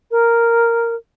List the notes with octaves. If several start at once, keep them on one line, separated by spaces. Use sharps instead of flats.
A#4